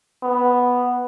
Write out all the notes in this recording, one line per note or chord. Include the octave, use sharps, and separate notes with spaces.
B3